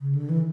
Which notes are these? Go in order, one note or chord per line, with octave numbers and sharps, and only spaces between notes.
C#3
D3
E3